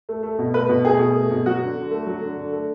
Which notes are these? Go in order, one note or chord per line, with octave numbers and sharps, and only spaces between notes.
A3
A3
B2
A3 B4
B2
A3 G#4
B2
A3
B2
F#3 F#4
D3
D3
A3
F#3
D3
D3
A3